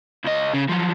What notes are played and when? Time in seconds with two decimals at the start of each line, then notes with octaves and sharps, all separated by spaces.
0.25 C#2 D#5
0.54 C#3
0.69 F3 F#3